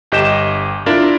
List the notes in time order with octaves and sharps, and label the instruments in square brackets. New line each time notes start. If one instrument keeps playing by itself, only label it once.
[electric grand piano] G1 G4 D#5 G6 E7
D4 E4 F4 A#4 D5